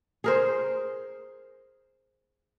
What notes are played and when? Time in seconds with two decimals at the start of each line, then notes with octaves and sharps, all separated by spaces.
0.24 G#4 A#4 C5